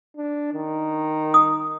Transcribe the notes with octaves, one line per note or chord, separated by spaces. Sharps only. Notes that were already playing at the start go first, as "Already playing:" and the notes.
D4
D#3
D#6